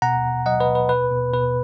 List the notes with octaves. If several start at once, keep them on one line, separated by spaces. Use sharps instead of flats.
B2 F#5 A#5
B2
F#3 D#5 F#5
B4 D#5
B2
B4
B2 B4
B2
B2 B4